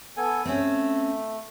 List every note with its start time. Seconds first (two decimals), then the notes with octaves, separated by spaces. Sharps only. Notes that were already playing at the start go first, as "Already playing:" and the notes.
0.17 B3 A4 G#5
0.45 A3 C4 C#4